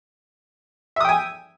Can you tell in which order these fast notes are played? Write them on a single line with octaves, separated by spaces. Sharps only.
E5 D#6 G5 G#5